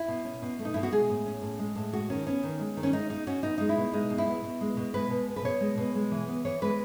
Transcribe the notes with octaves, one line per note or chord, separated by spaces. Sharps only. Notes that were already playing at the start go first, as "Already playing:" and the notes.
Already playing: E4
B2
C#4
B2
A3
D#4
B2 E4
F#4
G#3 G#4
A2
C#4
A2
G#3
A2
G#3 F#4
D#3 C#4
B3 C#4
D#3
G#3
D#3
C#4
G#3 D#4
B2 D#4
C#4 F#4
B2 D#4
G#3 D#4
E4
B2
G#3 D#4
B2
E4
B3
B2
G#3
B2
G#3 B4
B2
B3
B4
B2 C#5
G#3
B2
G#3
E3
B3
E3 C#5
G#3 B4